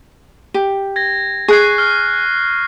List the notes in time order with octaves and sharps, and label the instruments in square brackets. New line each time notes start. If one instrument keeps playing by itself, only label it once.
[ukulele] G4
[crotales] G#6 A#6
[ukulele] G#4 [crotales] C#6 F#6 C7
[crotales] F6